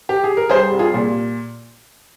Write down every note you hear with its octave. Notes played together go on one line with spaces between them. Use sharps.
G4
G#4
A#4
G3 G#4 C5
C2
F4 G#4
A#2